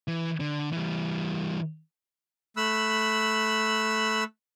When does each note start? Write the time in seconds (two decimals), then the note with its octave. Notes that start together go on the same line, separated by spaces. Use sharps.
0.08 E3
0.40 D3
0.73 E3 G3
2.57 A3 B5 E6 F#6